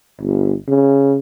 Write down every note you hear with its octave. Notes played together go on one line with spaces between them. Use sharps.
G1
C#3